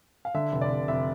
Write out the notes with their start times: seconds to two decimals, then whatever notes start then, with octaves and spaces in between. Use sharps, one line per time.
0.25 F5
0.34 D3 E5
0.52 F1
0.61 D5
0.70 F1
0.88 F1 E5